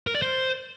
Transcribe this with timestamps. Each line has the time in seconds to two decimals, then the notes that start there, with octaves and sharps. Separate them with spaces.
0.07 A#4
0.15 D5
0.22 C5